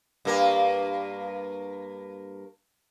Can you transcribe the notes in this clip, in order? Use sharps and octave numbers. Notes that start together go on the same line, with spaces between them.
G2 A#3 A#4